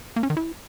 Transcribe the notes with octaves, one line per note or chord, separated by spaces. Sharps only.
A#3
C#4
D#3
E4